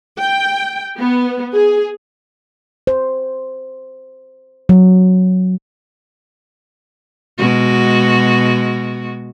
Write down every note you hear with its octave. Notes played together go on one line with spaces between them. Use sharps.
G5
B3
G#4
C5
F#3
B2 G#3 F#4